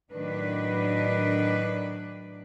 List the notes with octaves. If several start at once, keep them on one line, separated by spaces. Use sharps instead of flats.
A2 D#3 F#3 D4 B4